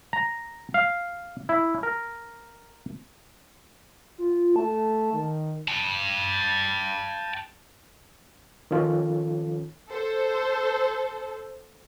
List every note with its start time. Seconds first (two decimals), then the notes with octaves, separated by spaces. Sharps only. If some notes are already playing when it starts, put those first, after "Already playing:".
0.13 A#5
0.74 F5
1.49 E4
1.83 A#4
4.18 F4
4.56 A3 A5
5.14 D#3
5.68 G5 A5
8.71 D#3 F3 C#4 F4 A4
9.91 A4 C5